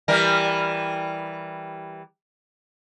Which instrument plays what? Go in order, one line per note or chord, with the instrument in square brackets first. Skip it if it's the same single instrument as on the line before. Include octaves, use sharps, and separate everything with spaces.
[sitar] E3 G3 A#4